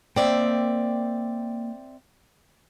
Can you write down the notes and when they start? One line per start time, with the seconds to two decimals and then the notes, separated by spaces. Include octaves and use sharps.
0.16 A#3 C4 D5 E5 G5